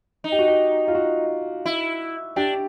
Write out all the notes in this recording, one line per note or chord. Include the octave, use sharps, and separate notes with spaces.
D#4
G4
F#4
G4
F4
F#4
E4
D4 G4